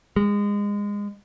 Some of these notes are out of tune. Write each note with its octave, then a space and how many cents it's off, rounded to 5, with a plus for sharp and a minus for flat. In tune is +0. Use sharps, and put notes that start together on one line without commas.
G#3 -25